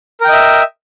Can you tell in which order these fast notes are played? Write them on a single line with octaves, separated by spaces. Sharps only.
A#4 G5 D#5 E5